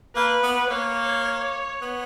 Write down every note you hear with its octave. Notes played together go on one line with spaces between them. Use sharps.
A#3 B4
B3
A#3 C#5
B3